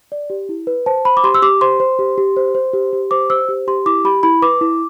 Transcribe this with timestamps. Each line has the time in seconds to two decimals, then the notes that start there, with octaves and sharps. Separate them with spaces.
0.12 D5
0.30 G4
0.49 E4
0.67 B4
0.86 C5 A5
1.05 C5 B5
1.17 D6
1.24 G4 C6
1.35 E6
1.42 G4 D6
1.61 C5 C6
1.80 C5
1.99 G4
2.18 G4
2.37 C5
2.55 C5
2.73 G4
2.93 G4
3.11 C5 D6
3.30 C5 E6
3.49 G4
3.67 G4 C6
3.86 E4 D6
4.05 G4 B5
4.23 E4 B5
4.42 B4 D6
4.61 E4